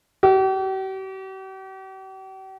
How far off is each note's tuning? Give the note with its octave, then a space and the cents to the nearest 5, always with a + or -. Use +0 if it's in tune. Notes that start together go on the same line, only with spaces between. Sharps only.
G4 -45